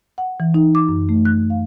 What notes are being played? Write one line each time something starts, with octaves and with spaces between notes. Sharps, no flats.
F#5
E3
D#4
D6
F#2
A3
F#6
F5